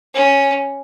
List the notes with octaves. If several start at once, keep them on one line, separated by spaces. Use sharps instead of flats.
C#4